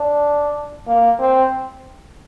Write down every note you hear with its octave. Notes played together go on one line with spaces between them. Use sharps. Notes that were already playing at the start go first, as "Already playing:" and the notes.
Already playing: D4
A#3
C4